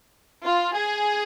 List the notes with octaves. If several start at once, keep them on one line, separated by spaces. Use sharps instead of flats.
F4
G#4